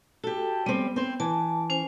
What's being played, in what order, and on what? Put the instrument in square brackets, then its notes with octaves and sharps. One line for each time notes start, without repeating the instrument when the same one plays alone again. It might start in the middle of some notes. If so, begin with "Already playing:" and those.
[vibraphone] F#4 [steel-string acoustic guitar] G4 A4
[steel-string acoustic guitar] G3 C4 [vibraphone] B3
[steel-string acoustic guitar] C4 C5
[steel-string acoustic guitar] E3 [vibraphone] A5
[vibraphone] C#4 C5 G#5